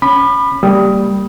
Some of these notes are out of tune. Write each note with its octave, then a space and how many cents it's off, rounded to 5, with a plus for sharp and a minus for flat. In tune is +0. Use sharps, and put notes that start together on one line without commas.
C#4 -5 B5 +0 D6 +45
G3 +0 A#3 -30 D#6 +15